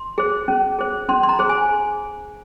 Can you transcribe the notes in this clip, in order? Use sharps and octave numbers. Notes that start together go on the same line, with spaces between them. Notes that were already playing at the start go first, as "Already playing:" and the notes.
Already playing: C6
G#4 C5
C#4
G#4 C5
C#4 C6
C6
A#5
G#4 C5
G#5